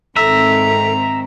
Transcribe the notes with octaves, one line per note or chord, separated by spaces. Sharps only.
G#2 D#3 C4 A4 E5 A#5